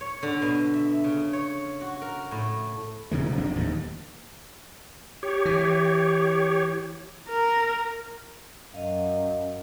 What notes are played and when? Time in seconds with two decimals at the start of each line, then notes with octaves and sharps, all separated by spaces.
0.01 C#5
0.23 D3
0.42 B2
0.74 E5
1.04 C#3
1.33 C#5
1.81 F#4
2.02 A#4
2.31 A2
3.11 C3 E3 G#3
3.25 C3 F3 F#3
3.37 F#1 F2 D4
3.56 D1 D#2 G#2 D#3
5.23 G4 C#5
5.45 E3
7.29 A#4
8.74 F#2 D#5 F5